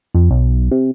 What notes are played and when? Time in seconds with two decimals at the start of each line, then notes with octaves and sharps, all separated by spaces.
0.14 F2
0.31 B1
0.71 C3